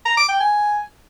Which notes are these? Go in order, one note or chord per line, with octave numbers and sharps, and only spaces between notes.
A#5
D6
G5
G#5